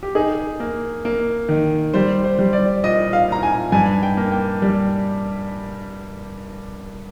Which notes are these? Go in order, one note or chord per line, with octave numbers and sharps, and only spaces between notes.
G4
D#4 G#4
A#3
A#3
D#3
G3 C5
C5
G3
D5
A#2 D#5
F5
A#2 A#5
G#5
G2 G#5
G5
A#3
G5
G3